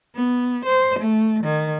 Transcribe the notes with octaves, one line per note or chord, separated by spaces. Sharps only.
B3
C5
A3
D#3